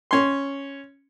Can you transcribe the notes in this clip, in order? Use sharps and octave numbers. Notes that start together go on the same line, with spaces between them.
C#4 C6